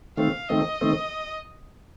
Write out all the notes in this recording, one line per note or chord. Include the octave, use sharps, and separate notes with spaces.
D#3 A3 C4 F5
D#3 A3 C4 D#5
D#3 A3 C4